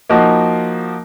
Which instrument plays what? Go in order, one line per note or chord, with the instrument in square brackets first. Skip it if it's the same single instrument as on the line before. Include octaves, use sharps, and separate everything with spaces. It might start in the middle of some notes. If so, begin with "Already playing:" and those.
[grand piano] F3 A#3 D#4 F#4